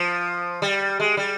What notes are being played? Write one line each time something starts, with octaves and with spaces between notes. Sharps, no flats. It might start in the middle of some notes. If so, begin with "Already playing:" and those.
Already playing: F3
G3
G#3
G3